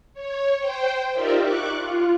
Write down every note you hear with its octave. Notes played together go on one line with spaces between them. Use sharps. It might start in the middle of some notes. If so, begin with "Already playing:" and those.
C#5
C5 G5
D#4 F4 G4 A#4 D5 E5
C#6 D6 F#6
F4